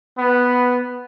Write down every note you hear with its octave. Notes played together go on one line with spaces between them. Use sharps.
B3